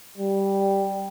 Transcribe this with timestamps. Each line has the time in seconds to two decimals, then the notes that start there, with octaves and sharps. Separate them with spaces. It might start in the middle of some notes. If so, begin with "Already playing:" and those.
0.18 G3